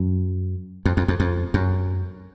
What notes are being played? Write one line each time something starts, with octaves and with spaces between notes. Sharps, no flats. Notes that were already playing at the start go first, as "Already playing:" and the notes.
Already playing: F#2
F2
F2
F2
F2
F#2